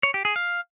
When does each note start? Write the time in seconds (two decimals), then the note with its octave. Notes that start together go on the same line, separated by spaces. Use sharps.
0.03 C#5
0.14 G4
0.25 G#4
0.36 F5